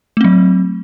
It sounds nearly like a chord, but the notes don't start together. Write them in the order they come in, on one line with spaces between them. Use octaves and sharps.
A3 C4 F#3